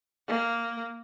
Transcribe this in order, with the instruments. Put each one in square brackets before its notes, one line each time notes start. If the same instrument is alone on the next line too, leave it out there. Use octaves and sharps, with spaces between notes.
[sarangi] A#3